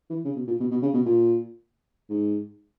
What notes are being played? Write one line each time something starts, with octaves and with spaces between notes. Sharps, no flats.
E3
C#3
B2
A#2
B2
B2
C#3
B2
A#2
G#2